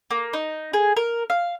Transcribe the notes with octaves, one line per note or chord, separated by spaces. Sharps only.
A#3
D#4
G#4
A#4
F5